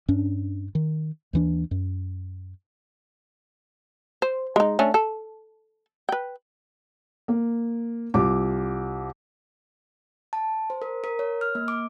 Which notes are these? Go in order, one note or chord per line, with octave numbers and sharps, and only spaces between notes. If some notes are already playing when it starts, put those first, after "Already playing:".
G2 C#4 D4
D#3
D#2 E3 D4
F#2
C5
G#3 D#4
A3 C#4 D4
A4
B4 G5
A#3
C2 F4 D6
A5
C5
A#4
A#4
C#5
F6
A#3
D6